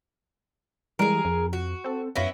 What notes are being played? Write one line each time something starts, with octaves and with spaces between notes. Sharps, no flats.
E3 G3 G#3 G#4 A#4
F2
F#4
C4 A4
F#2 B3 C#4 E4 F5 A#6